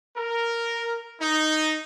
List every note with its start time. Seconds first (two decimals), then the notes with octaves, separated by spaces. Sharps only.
0.16 A#4
1.20 D#4